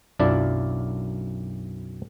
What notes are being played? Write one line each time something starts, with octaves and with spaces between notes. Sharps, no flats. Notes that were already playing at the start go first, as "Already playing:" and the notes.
B1 F#2 D4 E4 F4 D5